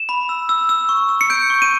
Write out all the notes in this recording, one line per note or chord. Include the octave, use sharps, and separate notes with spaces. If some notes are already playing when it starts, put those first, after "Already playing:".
Already playing: E7
B5
E6
E6
E6
C#6
E6
C#7
G6 D7
C#6
D#7